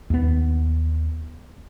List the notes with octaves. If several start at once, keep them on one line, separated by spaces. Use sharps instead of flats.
D#2 B3